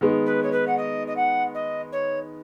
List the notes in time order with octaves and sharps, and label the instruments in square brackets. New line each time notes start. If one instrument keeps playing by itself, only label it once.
[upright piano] D#3 G#3 B3
[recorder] B4
C#5
B4
F#5
D#5
D#5
F#5
D#5
C#5